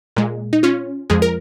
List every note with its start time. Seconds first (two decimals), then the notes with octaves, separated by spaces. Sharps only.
0.16 A#2 G#3
0.53 D#4
0.63 C#4 F4
1.10 F2 F3 G#3 G#4
1.22 A#4